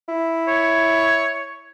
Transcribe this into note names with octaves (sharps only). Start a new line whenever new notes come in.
E4
C#5